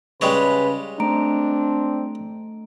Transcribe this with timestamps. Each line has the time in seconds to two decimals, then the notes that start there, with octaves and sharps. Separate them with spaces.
0.21 C#3 G3 G#3 B4 C#5
1.00 A3 C4 D4 A#5 D7